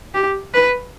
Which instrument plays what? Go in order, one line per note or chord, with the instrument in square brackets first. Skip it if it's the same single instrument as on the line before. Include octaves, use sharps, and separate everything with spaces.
[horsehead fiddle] G4
B4